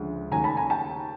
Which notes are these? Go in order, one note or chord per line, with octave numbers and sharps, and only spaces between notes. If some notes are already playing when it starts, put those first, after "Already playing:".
Already playing: D2 C#3 F3 G#3
D#2 C#3 F#3 A3 G#5 A#5
A5 B5
G#5 A#5
G5 A5